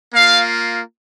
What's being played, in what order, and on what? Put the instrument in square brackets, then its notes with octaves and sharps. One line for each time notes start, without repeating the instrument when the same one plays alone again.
[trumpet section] A#3 F4 F5